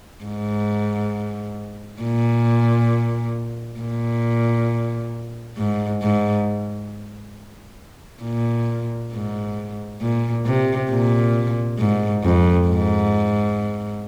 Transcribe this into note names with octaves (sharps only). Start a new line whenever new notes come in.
G#2
A#2
A#2
G#2
G#2
A#2
G#2
A#2
C3
A#2
G#2
F2
G#2